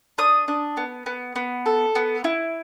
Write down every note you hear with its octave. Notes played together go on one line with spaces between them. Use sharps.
D4 D#6
D4
B3
B3
B3
A4
B3
E4